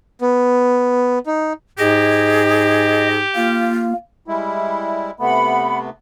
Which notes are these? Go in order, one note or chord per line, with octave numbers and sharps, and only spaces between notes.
B3
D#4
G#2 G4 G#4 D#5
A#3 F4
G3 G#3 E4
C3 A3 B3 F#5 B5